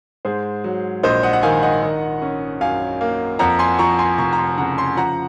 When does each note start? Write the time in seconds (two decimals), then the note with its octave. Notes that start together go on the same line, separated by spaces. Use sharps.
0.25 G#2 G#4 C5
0.64 F#3
1.03 A#1 C5 D#5
1.23 D#5 F#5
1.33 F#5
1.43 D#3 F5 G#5
1.63 D#5 F#5
1.82 D#3
2.22 C#4
2.61 F#2 F5 G#5
3.01 A#3
3.39 F2 F#5 A#5
3.59 G#5 C6
3.79 F3 A#5 C#6
3.99 G#5 C6
4.18 F1 A#5 C#6
4.33 A#5
4.38 G#5 C6
4.58 C#3 F#5 A#5
4.78 G#5 C6
4.97 F3 F#5 A#5